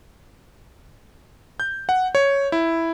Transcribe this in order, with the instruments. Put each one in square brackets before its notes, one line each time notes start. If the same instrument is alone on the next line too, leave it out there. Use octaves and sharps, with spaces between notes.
[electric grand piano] G6
F#5
C#5
E4